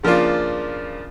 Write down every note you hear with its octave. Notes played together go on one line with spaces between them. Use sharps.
C#3 F3 A#3 D4 F4